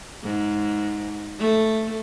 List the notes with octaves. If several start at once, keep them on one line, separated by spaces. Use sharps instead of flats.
G#2
A3